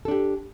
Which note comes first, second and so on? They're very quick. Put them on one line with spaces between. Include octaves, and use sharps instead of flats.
A4 D4 G4